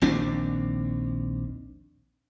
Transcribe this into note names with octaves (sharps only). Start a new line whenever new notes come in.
A#1 D#2 C4 D4